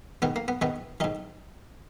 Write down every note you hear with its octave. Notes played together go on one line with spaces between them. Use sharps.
G#2 D#3 B3
A#3
B3
G#2 D#3 B3
G#2 D#3 D#4